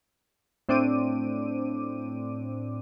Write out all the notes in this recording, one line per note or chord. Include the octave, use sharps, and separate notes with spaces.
A2 C4 D4 D6 D#7